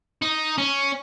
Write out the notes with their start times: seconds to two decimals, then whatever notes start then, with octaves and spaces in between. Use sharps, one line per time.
0.22 D#4
0.58 C#4